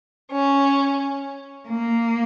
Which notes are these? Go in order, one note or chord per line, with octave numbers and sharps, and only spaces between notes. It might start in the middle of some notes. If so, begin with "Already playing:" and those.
C#4
A#3